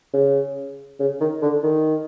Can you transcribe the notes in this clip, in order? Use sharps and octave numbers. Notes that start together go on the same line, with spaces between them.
C#3
C#3
D#3
D3
D#3